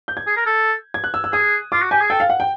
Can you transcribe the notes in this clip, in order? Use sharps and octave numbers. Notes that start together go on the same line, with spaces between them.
G6
G#6
G#4
A#4
A4
G#6
F#6
E6
E6
G#4 D#6
F4 D6
F#4
G4 G#5
G#4
A4 G5
F5
F#5
G5